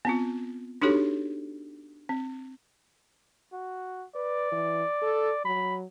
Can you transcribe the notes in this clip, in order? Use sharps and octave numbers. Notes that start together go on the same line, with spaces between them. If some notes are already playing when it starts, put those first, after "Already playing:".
B3 C4 F4
D4 D#4 F#4 G4 A4 C#5
C4
F#4
B4 D5
E3
A4
F#3 B5